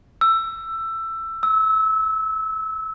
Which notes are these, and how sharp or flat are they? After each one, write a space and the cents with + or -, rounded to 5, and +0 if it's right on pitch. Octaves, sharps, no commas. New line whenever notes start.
E6 +15
E6 -25